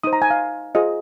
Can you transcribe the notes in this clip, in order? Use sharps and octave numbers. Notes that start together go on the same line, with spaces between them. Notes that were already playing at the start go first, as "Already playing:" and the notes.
D#4 C5 D#6
A#5
G#5
F5
F4 G#4 C5 D#5